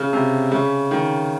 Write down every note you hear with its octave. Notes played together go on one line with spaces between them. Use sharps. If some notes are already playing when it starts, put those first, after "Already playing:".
Already playing: C#3
C3
C#3
D#3